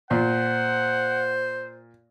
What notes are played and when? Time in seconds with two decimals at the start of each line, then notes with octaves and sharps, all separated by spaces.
0.11 A#2 C5 F#5